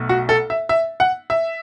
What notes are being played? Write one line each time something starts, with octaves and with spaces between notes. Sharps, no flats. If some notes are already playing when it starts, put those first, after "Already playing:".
Already playing: B1 B2 A3
F#4
A4
E5
E5
F#5
E5